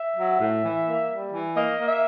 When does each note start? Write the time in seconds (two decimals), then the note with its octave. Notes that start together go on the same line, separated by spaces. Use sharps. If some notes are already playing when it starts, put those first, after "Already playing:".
Already playing: E5
0.17 F#3
0.40 A2
0.63 E3
0.86 A#3
1.09 G3
1.33 E3
1.56 A#3 D#5
1.79 A#3
1.87 E5